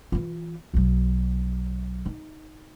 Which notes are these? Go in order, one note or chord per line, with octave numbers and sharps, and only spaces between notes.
E3 F4
B1 F#3
D#4